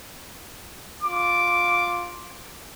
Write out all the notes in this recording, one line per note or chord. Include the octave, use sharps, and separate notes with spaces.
F4 D6